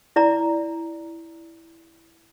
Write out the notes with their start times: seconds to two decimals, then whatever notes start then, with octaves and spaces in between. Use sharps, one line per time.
0.16 E4 D5 A#5